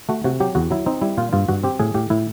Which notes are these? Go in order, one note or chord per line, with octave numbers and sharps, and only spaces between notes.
A3 F#4
C3 F#4
F#3 G4
E2 F#4
F#3 E4
C4 D#4
G3 E4
A#2 F4
G2 F4
G2 F#4
C4 G4
A2 G#4
A2 G4
A2 E4